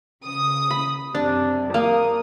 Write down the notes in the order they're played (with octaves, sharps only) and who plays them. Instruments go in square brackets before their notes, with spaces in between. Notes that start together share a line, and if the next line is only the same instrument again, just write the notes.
[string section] C#3 D#6
[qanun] B5
[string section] F#2 C3 [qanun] D4
[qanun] A#3 [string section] D#6